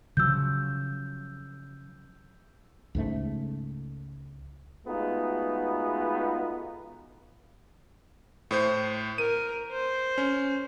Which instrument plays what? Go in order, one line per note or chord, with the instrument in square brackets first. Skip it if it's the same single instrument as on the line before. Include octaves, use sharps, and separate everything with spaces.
[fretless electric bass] C#3 F3 F#3 [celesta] E6 G6
[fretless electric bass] C#2 G#2 A3
[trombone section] G#3 A3 B3 D#4 F4 F#4
[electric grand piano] A2 C5 G6
[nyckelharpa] A#4 [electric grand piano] D#7
[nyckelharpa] C5
[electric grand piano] C#4